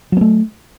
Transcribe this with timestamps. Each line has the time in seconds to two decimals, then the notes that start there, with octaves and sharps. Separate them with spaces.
0.12 F#3
0.17 B3
0.21 A3